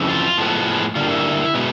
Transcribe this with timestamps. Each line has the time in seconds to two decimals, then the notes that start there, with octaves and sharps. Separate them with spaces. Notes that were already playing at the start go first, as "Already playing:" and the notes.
Already playing: F2 C#3 E3
0.08 F4
0.38 A2 F3 G#3 B3
0.95 D3 G3 A#3 F4
1.11 E4
1.54 B2 G#3 B3